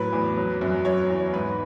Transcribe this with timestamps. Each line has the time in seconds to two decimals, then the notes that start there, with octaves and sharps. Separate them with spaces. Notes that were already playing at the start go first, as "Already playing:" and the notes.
Already playing: A2 F#3 B4
0.13 E2
0.37 F#3
0.61 F#2
0.85 F#3 C#5
1.10 E2
1.33 G#2 B4